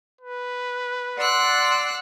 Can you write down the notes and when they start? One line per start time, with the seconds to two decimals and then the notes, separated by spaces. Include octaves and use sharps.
0.21 B4
1.18 D5 F#5 C6 E6 F#6